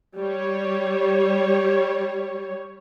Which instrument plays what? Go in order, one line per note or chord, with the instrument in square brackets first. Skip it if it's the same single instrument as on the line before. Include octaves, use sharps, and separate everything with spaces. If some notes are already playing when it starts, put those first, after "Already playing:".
[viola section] G3 C#5